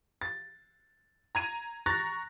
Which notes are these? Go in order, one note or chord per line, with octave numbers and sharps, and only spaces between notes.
A6
A#5 G#6 D#7
A#5 C#6 F#6 A6 A#6